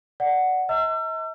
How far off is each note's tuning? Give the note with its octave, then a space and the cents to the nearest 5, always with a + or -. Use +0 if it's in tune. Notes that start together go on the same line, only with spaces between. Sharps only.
D5 +0 F#5 +0
D#5 +45 A#5 -45 E6 +40